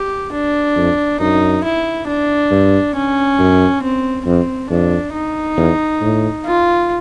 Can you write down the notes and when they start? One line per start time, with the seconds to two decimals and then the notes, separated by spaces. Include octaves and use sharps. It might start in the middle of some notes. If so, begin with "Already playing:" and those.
Already playing: G4
0.33 D4
0.77 F2
1.20 F#2 D#4
1.64 E4
2.08 D4
2.51 G2
2.95 C#4
3.39 F#2
3.83 C4
4.26 F2 C4
4.70 F2 D4
5.14 D#4
5.57 E2
6.01 A2
6.45 F4